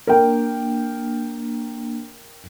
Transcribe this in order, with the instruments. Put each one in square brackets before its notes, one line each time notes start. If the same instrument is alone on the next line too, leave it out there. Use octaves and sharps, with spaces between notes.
[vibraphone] A#3 D4 [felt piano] A#4 G5